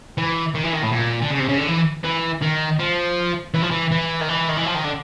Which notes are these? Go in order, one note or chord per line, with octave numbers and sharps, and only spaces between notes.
E3
D#3
E3
D#3
A2
A#2
D3
C#3
C3
C#3
D3
E3
E3
D#3
F3
E3
F3
E3
E3
D#3
E3
D#3
E3
F3
D#3
D3